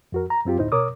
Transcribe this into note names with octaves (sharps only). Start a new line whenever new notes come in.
F2 F#4 A#4
A#5
F#2 C4 F4 G4
D2 A2 D#4 E4 C5
B2 A#4 C#5 D6 D#6